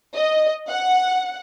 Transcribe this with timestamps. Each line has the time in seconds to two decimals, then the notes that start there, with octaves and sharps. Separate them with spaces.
0.14 D#5
0.69 F#5